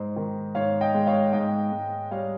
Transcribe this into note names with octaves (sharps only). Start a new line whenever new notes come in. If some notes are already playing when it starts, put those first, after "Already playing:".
Already playing: G#2 C5 D#5
D#3
G#2 C#5 F5
D#5 G5
G#3
C#5 F5
G#2 D#5 G5
G#2
G3 C#5 F5